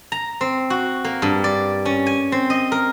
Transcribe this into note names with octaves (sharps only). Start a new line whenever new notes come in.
A#5
C4
F#4
A#3
G2
D5
C#4
G#5
C4
D#5
A#4